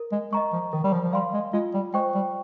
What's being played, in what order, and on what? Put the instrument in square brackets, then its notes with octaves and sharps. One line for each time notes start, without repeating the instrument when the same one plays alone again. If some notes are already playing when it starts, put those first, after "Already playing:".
Already playing: [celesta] A#4
[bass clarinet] G#3
[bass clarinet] G#3 [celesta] D#5 A#5 C#6
[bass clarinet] F3
[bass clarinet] D#3 [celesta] A#4
[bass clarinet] G3
F3
F3
[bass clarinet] G3 [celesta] F5 C6
[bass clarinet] G#3
[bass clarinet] G#3 [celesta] F4
[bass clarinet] G3
[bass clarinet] G#3 [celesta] C5 G5 C#6
[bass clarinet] G3